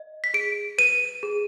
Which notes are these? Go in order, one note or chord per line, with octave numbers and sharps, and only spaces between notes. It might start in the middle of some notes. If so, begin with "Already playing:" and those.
Already playing: D#5
B6
G#4 D7
B4 D#7
G#4